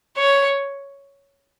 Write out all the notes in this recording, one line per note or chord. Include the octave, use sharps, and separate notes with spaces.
C#5